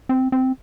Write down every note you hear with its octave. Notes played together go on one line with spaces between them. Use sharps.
C4
C4